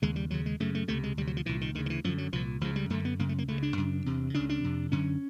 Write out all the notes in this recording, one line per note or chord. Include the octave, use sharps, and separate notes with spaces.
D#2 C#3 G#3
G3
D#2 C#3 F#3
G#3
F#2 C#3 A3
A3
C#2 C3 A3
G#3
D2 C3 G3
F#3
F3
C2 A#2 E3
D#3
D2 C#3 D#3
D#3
E3
F#2 D3 F3
F#3
C2 A#2 F3
C#2 C#3 F3
G3
F#2 D3 A3
B3
F#2 C#3 A#3
A3
A#3
C#2 C#3 A3
D4
F#2 C#3
E2 C3
C#2 C#3 D4
D4
F2 C3
F#2 D3 C#4